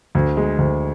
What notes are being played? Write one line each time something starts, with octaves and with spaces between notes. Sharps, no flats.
D2
G#3
D2